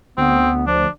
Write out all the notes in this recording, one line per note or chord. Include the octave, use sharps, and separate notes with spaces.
D2 B3 C4
F3 D4